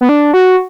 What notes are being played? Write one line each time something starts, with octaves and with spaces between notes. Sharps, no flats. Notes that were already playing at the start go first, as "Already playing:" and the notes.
B3
D4
F#4